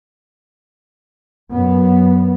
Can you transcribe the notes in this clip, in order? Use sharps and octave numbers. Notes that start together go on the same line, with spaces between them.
F#2 B3